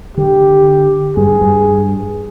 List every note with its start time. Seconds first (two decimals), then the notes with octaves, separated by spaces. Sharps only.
0.17 D3 G4
1.16 G2 G#4
1.41 G2